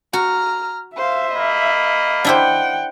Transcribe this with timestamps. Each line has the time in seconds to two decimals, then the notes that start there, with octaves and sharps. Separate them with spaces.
0.13 F#4 A#5 F6
0.96 C5 E5 F5
1.32 A#3 D#5 B5
2.25 D4 E4 C5 F#5 G5